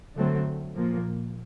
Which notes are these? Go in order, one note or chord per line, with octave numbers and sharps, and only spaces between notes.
D3 F#3 A3 C4
A#2 F3 A#3